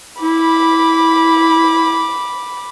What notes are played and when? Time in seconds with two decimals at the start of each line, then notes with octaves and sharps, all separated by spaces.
0.22 E4 B5 D6